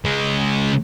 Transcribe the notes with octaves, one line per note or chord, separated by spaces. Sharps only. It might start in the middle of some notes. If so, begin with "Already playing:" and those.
C#3 G#3